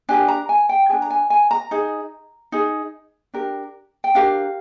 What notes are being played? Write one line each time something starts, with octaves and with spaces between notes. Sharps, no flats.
D4 G4 A#4 G#5
A#5
G#5
G5
D4 G#4 G#5
A#5
G#5
G#5
A#5
D#4 G#4
D#4 G#4
D4 G4 A#4
G5
D4 G4 A#4 F5